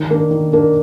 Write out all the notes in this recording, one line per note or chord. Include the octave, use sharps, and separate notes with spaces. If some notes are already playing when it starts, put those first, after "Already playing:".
Already playing: D#3
A#3 D4
D#3
A#3 D4